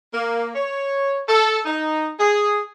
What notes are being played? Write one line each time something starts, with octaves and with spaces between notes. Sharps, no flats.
A#3
C#5
A4
D#4
G#4